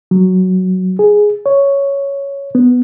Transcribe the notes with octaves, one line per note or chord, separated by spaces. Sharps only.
F#3
G#4
C#5
B3